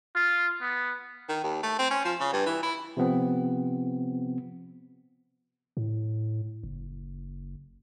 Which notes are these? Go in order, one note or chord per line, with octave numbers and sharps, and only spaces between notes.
F4
B3
D#3
D#2
A3
C4
C#4
F3
C#3
G2
E3
E4
C3 F3 B3 C4
A2
F#1